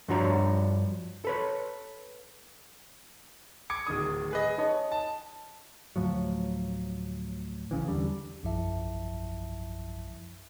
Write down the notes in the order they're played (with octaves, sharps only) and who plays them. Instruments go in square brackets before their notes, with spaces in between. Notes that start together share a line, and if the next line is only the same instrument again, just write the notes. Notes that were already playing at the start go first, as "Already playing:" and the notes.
[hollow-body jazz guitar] G2 F3 D4 F#4 C#5 A#5
A4 B4 C#5
[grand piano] D6 G#6 C#7
D1 D#3 D#6
G#4 B4 D#5
[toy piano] D#4 D#5 D#6 [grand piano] C#5
[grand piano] A5
[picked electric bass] D2 A2 F3 F#3
C#2 C#3 E3
E2 D3 G3
[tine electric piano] A#1 F#2 F3 E4 E5 A5